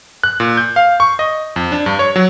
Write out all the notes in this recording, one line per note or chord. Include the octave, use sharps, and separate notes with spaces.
F#6
A#2
G6
F5
C#6
D#5
F2
D4
G2
C#5
F#3